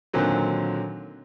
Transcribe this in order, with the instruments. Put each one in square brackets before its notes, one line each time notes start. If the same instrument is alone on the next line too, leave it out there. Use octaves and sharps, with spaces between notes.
[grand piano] A#2 D3 D#3 F#3 C4